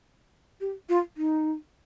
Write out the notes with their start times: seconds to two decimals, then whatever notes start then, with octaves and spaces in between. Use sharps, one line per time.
0.61 G4
0.89 F4
1.17 D#4